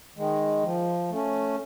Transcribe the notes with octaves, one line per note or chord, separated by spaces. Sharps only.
D#3 G#3
F3
A3 C#4